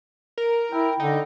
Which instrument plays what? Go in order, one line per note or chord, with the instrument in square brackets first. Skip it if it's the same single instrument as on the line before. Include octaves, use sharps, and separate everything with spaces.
[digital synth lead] A#4
[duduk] E4 [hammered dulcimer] G5
[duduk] D3 [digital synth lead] D#4